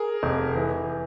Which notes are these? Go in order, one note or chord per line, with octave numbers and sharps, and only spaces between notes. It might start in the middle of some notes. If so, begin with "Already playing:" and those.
Already playing: G#4 A#4
F1
E3